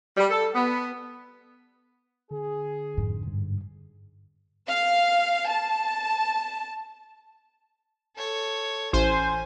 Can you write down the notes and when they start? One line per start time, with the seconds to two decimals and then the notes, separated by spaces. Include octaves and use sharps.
0.17 G3
0.31 A4
0.55 B3
2.31 D3 G#4
2.97 F2 G#2
3.27 G2
4.70 F5
5.50 A5
8.16 A4 C#5
8.93 A1 C#4 C5 G#5